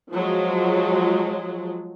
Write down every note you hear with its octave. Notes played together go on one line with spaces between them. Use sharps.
F3 F#3 G#3